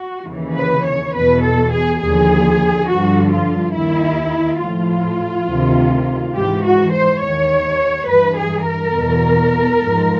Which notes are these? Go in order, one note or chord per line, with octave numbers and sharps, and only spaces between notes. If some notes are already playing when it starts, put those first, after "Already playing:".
Already playing: F#4
D#2 C#3 E3
B4
C#5
E2 B2 B4
A4
G#4
D#2 D3 F3 G#4
G2 D3 F3 F#4
F4
D#2 D#3 E4
A2 F3 F4
D2 C3 D#3
G#2 E3 G4
F#4
C5
D#2 D#3 C#5
G2 E3 B4
G#4
A#4
E2 B2
G#2 F3